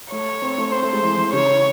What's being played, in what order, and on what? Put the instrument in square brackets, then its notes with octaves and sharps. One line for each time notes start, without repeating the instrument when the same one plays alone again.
[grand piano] A3 [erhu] C#5
[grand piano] C4
A3
[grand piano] C4 [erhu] C5
[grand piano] A3
G#3
E3
E3
[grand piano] C#3 [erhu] C#5